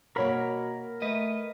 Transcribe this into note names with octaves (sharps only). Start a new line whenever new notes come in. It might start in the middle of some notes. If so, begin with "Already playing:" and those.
B2 A#3 A#4 C#5 F#5 B5
A3 B4 D#5